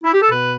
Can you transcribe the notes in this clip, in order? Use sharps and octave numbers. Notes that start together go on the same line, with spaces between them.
E4
G4
A4
B2 B3 B4